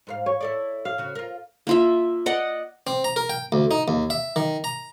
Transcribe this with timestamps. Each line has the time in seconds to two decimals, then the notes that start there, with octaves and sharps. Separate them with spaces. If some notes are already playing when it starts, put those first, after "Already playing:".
0.07 G#2 B4 F5
0.26 C#5
0.41 E4 A4 D5
0.85 F5
0.98 C#3 F#4
1.15 F4 A#4
1.67 A#3 F4 E5
2.26 D5 D#5 F#5
2.87 C4
3.04 A#5
3.16 A#4
3.30 G5
3.52 D2
3.71 D#4
3.88 D#2
4.10 E5
4.36 D#3
4.64 A#5